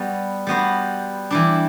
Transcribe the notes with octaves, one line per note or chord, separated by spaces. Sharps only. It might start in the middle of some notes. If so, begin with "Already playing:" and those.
Already playing: G3 B3 F#4
G3 B3 F#4 C5
E3 G3 D4